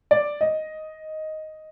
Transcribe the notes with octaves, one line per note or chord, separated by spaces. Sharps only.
D5
D#5